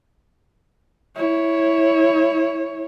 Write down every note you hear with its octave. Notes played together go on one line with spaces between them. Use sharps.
E4 C#5